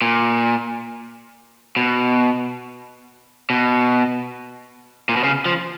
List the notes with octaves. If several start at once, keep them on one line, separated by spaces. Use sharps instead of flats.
A#2
B2
B2
A#2
B2
C#3
F3